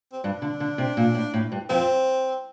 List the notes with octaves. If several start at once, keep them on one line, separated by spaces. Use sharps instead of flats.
C4
G2 D4
D3
D3
C3
A#2
A2
A2
G2
F2 C4